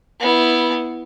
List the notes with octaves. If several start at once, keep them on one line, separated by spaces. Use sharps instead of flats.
B3 E4